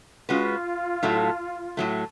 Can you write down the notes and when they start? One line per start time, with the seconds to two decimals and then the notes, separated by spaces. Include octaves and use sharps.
0.29 G#3 C#4 F4 F#4 B4
1.03 A2 F#3 A3
1.77 A2 F#3 A3